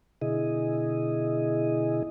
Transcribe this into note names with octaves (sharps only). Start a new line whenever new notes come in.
B2 D3 E4 G#4 D#5